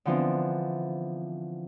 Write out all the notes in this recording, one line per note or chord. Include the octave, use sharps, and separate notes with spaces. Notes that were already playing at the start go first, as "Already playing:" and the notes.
D3 E3 F3 B3 C4 D4